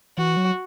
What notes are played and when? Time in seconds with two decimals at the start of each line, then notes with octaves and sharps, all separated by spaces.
0.18 E3 F#4
0.37 F#3